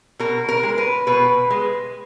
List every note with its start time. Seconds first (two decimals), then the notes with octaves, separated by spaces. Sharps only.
0.19 B2 A#4
0.49 A#4
0.63 G#3
0.78 B4
1.07 B2 B4
1.50 G#3